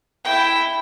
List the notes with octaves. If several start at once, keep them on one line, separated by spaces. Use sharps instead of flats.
E4 G5